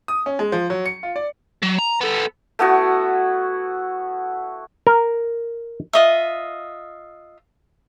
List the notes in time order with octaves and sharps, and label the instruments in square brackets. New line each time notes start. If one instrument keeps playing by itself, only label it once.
[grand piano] D#6
C#4
G#3
F3
F#3
C#7
F4
D5
[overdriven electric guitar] F#3
A#5
B3 A4
[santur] A3 B3 E4 F#4
[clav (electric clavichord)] A#4
[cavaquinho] F4 D#5 E5